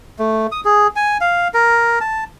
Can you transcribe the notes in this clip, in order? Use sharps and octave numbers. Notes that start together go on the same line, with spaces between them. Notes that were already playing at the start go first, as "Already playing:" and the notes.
A3
D#6
G#4
G#5
F5
A#4
A5